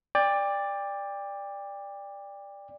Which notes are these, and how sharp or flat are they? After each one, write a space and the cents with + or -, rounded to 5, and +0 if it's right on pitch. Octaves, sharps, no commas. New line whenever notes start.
D5 +0 G5 +30